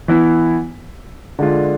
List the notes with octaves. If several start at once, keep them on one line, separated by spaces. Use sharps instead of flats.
E3 B3 E4
D3 G#3 D4 F4